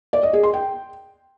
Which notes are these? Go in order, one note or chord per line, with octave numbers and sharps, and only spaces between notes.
D5
D#5
G#4
C6
G5